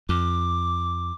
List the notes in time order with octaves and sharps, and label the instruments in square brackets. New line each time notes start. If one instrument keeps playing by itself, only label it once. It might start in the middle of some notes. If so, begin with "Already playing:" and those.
[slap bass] F2 [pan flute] D6